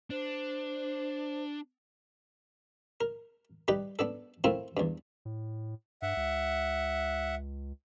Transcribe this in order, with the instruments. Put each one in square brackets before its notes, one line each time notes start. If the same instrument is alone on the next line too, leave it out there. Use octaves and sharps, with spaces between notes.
[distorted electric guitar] D4 [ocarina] C5
[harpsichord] A#4
G3 D#4 G4 B4
B3 D4 A4
A3 C4 E4 F4 A#4
E2 G2
[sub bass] A2
[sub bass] G2 [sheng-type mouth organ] E5 F#5
[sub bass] C#2